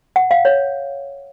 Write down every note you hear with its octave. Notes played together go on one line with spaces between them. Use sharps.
F#5
F5
C#5